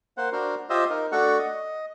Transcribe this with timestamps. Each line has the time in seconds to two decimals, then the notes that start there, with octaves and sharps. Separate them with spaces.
0.17 A#3 C5 F#5
0.32 D4 F#4 A#4 C5
0.70 F4 G4 C5 D#5 E5
0.90 D#4 A#4
1.12 A3 D4 F#4 A4 F#5 C#6
1.39 D#5